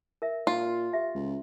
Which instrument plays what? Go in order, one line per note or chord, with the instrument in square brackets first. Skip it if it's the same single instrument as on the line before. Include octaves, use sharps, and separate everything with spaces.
[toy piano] A#4 E5
[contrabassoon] A#2 [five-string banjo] F4
[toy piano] G4 E5
[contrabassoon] C#2